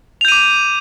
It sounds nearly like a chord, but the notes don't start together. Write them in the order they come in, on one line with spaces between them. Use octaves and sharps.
F7 G6 D#7 D6